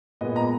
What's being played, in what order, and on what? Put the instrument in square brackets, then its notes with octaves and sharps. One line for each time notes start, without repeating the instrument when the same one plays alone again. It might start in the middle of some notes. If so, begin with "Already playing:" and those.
[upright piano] A#2 G#3 B3 D#5
A#5